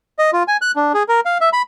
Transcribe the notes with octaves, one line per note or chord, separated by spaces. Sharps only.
D#5
F4
G#5
F#6
D4
G#4
A#4
F5
E5
B5